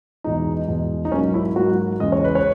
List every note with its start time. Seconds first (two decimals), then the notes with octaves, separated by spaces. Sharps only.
0.24 E2 B2 G#3 D#4
0.68 E2 B2 G#3
1.05 D#4
1.12 G#2 F#3 A#3 C#4
1.34 E4
1.56 G#2 F#3 A#3 F#4
2.00 E2 C#3 G#3 D#5
2.12 C#5
2.24 B4
2.35 C#5